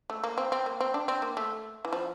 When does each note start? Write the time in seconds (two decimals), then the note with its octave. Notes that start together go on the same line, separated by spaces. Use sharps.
0.10 A3
0.24 A#3
0.38 C4
0.52 C4
0.66 A#3
0.80 C4
0.94 D4
1.08 C4
1.22 A#3
1.37 A3
1.85 E3
1.93 F3